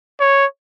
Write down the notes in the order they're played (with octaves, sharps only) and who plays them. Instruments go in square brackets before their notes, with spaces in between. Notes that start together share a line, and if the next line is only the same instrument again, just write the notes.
[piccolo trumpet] C#5